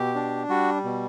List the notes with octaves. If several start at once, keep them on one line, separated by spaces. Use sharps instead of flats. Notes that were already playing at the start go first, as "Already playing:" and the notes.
Already playing: B2 G4
D4
G3 F#4
B2